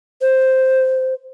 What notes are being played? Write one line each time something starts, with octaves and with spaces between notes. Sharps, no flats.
C5